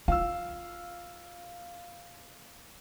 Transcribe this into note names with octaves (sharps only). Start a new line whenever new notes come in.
F4 F5 E6